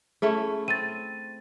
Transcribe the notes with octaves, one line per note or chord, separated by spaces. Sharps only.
A3 C#4 E4 G#4
C4 A6 D#7